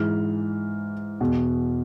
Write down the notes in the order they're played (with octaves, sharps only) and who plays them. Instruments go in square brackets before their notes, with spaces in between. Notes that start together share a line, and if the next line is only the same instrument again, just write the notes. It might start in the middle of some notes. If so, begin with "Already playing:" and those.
Already playing: [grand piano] G#2 E3 F6
E2 B2